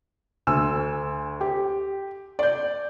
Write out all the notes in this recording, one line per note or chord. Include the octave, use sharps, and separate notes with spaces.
D2 G#5 E6
G4
D5 G6